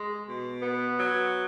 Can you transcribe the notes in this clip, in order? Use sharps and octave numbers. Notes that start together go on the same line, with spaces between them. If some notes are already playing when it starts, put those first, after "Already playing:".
Already playing: G#3
B2
B3
F#3